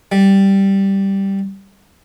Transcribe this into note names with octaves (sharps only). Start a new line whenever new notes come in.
G3